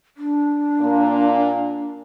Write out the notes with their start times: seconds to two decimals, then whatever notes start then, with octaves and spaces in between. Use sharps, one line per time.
0.17 D4
0.80 A#2 A#3